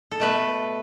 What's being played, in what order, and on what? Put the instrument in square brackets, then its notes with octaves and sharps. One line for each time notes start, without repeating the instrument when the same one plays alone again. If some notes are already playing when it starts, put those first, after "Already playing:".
[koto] A4
B2 A3 B4